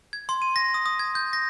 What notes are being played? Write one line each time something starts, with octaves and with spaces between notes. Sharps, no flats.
G#6
C6
D#7
A#6
D#6
D#6
G#6
G6
A#6